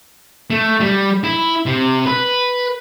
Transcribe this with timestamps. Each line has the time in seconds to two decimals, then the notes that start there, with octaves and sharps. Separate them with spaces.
0.50 A3
0.80 G3
1.24 E4
1.66 C3
2.06 B4